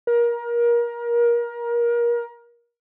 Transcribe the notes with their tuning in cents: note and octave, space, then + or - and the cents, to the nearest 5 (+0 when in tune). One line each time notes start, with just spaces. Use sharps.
A#4 +25